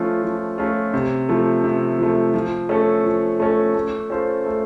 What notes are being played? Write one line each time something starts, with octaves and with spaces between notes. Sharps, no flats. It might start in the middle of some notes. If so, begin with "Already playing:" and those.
Already playing: F3 A3 C#4 F4
F3
A3 C#4 F4
C3
F3 A3
C3
F3 A3
F3
A3 C#4 A4
F3
A3 C#4 A4
A3
C#4 F4 A4 C5
A3